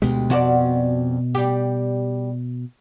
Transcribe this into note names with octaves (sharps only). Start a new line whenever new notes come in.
D2 B2 G#3 G4
F2 B2 F#4 D5
G3 G4